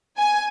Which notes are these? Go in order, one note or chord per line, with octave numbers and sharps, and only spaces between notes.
G#5